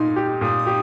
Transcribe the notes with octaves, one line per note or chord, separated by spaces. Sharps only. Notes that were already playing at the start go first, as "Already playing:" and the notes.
Already playing: A#2 D#4 C6
G4
A#2 D#6
G4